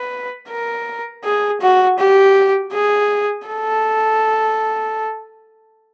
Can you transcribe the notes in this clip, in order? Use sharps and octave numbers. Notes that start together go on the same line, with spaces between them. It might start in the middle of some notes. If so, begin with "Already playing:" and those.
Already playing: B4
A#4
G#4
F#4
G4
G#4
A4